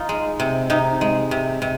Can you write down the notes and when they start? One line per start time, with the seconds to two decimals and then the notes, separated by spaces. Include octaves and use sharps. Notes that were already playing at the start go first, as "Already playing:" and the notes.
Already playing: D#4 F4
0.09 G#3
0.40 C3
0.70 C3 D#4
1.01 G#3
1.31 C3
1.62 C3